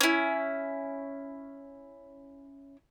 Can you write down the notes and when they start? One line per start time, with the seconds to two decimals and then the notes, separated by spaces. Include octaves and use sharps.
0.01 C#4 E4